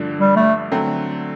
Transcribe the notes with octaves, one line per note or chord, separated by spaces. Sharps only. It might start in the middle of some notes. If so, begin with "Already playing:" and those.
Already playing: G2 D3 F3 A3 D4
G3
A3
D3 F#3 A3 C4